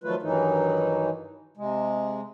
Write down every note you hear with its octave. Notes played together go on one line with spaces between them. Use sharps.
D#3 F3 F#3 A3 F4 B4
G2 D#3 E3 F#3 D#4
C3 G#3